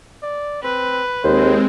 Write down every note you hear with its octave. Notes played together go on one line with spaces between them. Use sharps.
D5
C4 B4
D#2 G#3 C4 C5